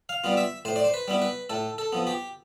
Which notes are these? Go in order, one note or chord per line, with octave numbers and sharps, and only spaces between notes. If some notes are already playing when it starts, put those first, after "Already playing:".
F5
G3 B3 F4
E5
A2 C5
D5
C5
B4
G3 B3 E4
B4
A2 A4
A4
F3 B3
G4